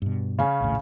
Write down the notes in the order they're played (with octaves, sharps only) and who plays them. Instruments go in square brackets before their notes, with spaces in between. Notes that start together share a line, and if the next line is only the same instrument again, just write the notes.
[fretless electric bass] G2 B2
[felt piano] C#3 C#4
[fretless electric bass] A#1 D#2 A2